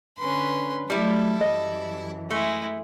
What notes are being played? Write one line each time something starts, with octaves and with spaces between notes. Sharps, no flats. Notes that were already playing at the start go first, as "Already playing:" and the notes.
D3 C#4 B4 C6
F#3 G3 A3 E4 A4
F#2 E3 D#5
G#3 A3 E4